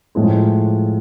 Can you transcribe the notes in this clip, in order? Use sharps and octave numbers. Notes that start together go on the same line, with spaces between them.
A2 F3 G#3